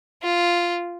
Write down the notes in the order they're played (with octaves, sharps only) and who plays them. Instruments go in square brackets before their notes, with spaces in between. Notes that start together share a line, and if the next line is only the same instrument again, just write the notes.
[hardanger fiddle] F4